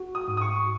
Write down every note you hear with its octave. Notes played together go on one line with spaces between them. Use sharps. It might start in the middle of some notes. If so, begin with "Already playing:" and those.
Already playing: F#4
D#6
G#2
D#6
C#6